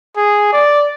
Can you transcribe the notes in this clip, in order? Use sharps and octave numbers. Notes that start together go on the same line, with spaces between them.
G#4
D5